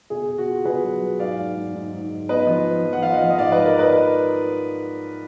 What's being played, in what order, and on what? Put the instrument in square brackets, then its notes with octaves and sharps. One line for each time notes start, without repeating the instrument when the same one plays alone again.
[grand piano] B2 G#4
B2
F#4
F4
B2 G#4 B4
F#3
F#3
G#2 D5 F5
G#2
G#2
G#2
G#2
G#2
B3 B4 D#5
F3
D#4
F3
F#5
F3 F5
D#5 F#5
F3
D#5
G#2 D5 F5
G#2 B4 D#5
A#4 D5
B4 D#5